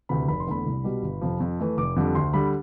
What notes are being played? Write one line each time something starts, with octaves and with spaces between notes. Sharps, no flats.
D2 C3 E3 B5
F1 B5
C6
E2 D3 A3 B5
C2
B2 G3
G1
F2 C3 F3
F2
E3 A3
F1 D6
F2 D3 G3
D2 C6
D3 G3 B5